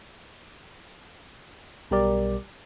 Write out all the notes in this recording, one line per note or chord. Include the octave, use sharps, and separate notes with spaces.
B1 B2 G3 G4 A#4 D5